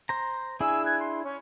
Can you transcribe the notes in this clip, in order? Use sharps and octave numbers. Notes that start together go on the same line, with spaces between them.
C5 A#5
D4 E4 G#4 G#5 E6
F#6 G#6
C6
C#4